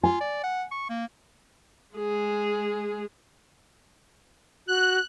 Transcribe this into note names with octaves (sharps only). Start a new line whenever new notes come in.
F4 G#5
D5
F#5
C#6
A#3
G#3 G#4
F#4 F#6